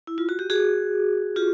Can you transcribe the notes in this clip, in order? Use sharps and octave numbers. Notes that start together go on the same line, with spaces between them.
E4
F4
F#4
G4
F#4 G#4
F4 G4